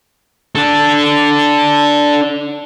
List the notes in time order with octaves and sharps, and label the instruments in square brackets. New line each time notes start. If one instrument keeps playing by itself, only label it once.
[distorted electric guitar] D4 A4